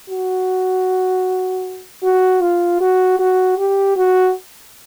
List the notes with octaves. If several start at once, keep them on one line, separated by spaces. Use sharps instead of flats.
F#4
F#4
F4
F#4
F#4
G4
F#4